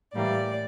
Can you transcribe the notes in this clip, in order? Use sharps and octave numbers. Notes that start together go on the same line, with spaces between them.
A2 E3 G3 A#3 D5